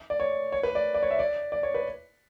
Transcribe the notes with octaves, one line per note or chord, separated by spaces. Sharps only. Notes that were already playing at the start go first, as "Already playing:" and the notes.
D5
C#5
C#5
B4
D5
D5
C#5
E5
D5
D5
C#5
B4